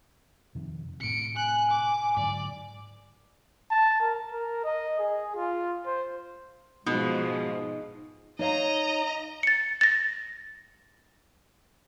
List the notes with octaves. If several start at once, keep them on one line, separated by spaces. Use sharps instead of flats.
F2 C3 D#3
A2 C3 C#7 D7
G#5 F#6
D6
G#2 D3 F#3 D5
A5
A#4
A#4
D#5
G#4
F4
C5
G#2 B2 F3 G#3 D#4
D#4 C#5 D#5 F5 A#5
A6 C#7
A6 A#6